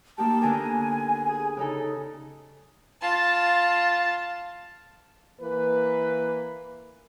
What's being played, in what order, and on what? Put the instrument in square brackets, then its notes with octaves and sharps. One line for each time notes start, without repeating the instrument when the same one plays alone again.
[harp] A#3 D#4 G4 [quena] A5
[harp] D3 B3 A#4 [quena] G#5
[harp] G#4
C#3 D#4 A4
[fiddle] F4 A5
[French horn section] E3 A#3 B4